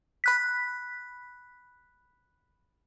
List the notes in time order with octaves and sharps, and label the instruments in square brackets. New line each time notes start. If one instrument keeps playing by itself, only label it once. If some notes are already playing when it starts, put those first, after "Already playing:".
[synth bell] B5 F#6 B6